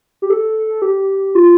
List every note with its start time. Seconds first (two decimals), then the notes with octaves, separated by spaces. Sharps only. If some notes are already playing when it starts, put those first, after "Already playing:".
0.22 G4
0.30 A4
0.82 G4
1.35 F4